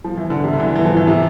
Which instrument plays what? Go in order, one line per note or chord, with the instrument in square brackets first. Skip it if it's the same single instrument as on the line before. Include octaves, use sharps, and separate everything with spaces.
[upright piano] F3
E3
D3
C3
D3
E3
E3
F3
E3
C3